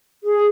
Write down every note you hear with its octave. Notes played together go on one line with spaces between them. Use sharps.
G#4